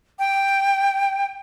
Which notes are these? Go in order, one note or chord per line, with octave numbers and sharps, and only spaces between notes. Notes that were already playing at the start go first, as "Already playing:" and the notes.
G5